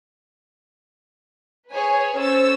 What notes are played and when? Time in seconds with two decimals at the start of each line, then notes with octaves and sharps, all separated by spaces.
1.70 G#4 B4 C#5 G#5
2.20 C#4 A4 C5 C#6 E6 A6